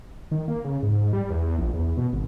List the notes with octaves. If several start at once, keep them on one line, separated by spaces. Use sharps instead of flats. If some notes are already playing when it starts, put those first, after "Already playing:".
D#3
A#3
C#3
G#2
G#2
G3
E2
A#1
E2
B2
G#1